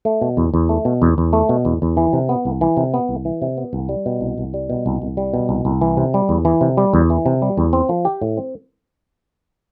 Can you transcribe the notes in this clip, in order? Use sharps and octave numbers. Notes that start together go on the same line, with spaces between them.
A3
B2
E2
E2
A3
B2
E2
E2
A3
B2
E2
E2
E3
C3
B3
C2
E3
C3
B3
C2
E3
C3
B3
C2
G3
B2
C2
C2
G3
B2
C2
C2
G3
B2
C2
C2
E3
C3
G3
E2
E3
C3
G3
E2
E3
C3
G3
E2
C4
F3
G4
A2
C4